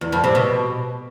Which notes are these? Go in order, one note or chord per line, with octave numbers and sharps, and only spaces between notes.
E2
F2
C3
B2